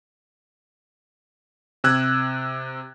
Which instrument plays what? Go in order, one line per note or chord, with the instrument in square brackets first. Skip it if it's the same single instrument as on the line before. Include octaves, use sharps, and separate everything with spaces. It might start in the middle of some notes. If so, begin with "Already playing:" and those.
[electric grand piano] C3 E6 F#6 G#6